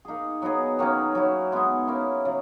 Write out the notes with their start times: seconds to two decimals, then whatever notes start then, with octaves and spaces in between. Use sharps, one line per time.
0.05 A#3 D#4 G#4
0.42 F#3 B3 D#4 G#4
0.79 D#3 F#3 A#3 C#4
1.15 F#3 C#4 E4
1.52 G#3 B3 D#4
1.87 A#3 C#4 E4 A#4
2.25 C#3 F#3